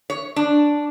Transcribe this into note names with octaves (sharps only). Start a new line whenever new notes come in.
C#5
D4